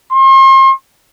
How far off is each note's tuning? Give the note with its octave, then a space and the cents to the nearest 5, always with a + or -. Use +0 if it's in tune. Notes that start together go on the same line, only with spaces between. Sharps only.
C6 +40